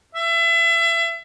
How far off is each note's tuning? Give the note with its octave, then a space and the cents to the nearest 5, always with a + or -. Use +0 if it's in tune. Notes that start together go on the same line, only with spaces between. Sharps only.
E5 +30